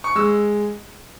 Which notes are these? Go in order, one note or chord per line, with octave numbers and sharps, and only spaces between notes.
C#6
G#3 E6